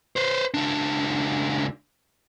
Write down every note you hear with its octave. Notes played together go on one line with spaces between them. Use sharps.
B4 C5
C#2 D4